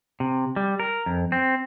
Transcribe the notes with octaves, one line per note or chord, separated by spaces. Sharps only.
C3
G3
A#4
F2
C4